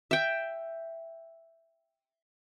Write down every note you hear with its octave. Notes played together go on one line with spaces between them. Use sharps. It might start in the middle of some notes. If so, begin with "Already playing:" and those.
E5 G5